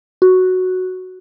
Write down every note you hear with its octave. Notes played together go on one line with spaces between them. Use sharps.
F#4